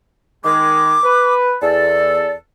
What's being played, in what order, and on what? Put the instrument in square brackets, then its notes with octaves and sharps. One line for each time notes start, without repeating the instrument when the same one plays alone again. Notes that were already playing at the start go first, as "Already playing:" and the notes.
[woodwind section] D#3 G#3 [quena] D6
[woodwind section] B4
[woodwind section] E2 A4 [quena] D5